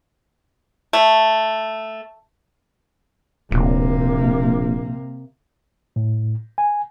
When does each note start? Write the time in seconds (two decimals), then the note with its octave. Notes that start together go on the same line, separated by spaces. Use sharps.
0.93 A3
3.51 D1 A#1 C3 A#3
5.96 A2
6.58 G#5